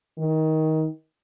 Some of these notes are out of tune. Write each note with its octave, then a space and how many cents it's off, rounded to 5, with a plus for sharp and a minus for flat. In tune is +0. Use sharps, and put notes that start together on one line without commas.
D#3 +20